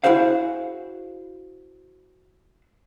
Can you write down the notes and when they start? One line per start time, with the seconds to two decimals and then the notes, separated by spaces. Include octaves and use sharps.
0.04 E4 F#4 G#4 C5 F5